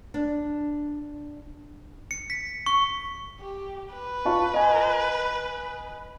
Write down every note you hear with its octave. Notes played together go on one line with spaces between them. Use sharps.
D4
C#7
B6
C#6
G4
B4
F4 A5 C#6
D#5 G#5